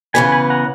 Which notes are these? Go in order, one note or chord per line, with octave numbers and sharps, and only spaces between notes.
C#3 E3 B3 G#5 B5
G#5 B5
F#5 A#5